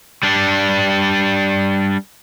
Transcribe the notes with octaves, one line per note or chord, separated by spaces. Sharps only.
G3 D4